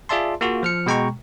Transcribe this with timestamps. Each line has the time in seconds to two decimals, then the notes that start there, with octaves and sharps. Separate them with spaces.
0.09 F4 G#4 D5 E5 A5 C6
0.41 A#3 F4 F#4 G#4
0.63 F3 F6 C#7
0.86 B2 G#3 G5 A#5 C#6